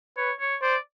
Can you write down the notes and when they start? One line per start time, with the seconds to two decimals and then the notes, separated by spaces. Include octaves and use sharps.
0.17 B4 C#5
0.40 C#5
0.62 C5 D5